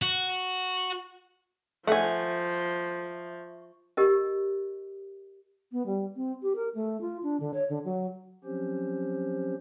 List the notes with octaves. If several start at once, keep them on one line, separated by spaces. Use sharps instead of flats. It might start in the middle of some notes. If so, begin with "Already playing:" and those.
F#4
F3 A3 E5 F#5 G#5 C#6
G4 A#4 D#5
B3
G3
C4
G4
A#4
A3
F4
D4
D3
C#5
D3
F#3
F3 F#3 C4 C#4 G4 C5